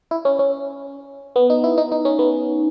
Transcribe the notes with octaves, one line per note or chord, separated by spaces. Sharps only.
E4
C#4
C#4
B3
D#4
E4
D#4
D#4
C#4
B3